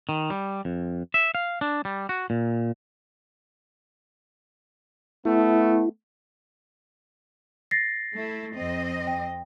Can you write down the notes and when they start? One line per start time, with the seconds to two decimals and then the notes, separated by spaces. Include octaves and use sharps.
0.09 D#3
0.30 G3
0.65 F2
1.14 E5
1.35 F5
1.61 D4
1.85 G3
2.09 F#4
2.30 A#2
5.25 A3 B3 E4
7.71 A6 A#6 C7
8.15 A3 E4
8.53 F2 C4 D#5
9.07 G5